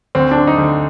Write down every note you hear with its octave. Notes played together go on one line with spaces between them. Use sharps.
D2 C4
D4
D3
D#4
D2